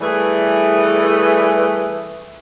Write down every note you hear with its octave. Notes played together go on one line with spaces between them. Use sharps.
E3 G3 A3 G#4 B4